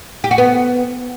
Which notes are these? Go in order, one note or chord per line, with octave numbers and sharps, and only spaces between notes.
G4
F#4
B3